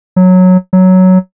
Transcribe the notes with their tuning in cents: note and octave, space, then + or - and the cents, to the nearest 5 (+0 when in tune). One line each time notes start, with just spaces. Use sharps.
F#3 -10
F#3 +5